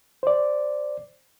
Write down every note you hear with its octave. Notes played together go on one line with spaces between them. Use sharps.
C5 D5